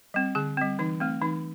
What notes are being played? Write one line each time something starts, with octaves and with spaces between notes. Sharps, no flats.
G3 C4
D3 G#4
G3 C4
E3 D#4
A3 C4
E3 D#4